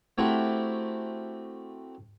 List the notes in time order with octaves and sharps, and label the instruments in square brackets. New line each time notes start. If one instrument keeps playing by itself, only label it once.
[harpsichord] A3 C4 E4 F#4 G4 A#4